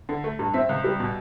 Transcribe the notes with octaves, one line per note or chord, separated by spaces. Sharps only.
D3
A3
G2
C4 E5
C#2
G3
B2